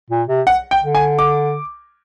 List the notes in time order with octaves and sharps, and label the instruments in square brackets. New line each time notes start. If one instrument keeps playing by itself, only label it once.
[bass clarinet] A#2
C3
[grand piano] F#5
G5
[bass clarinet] D3
[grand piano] G#5
D6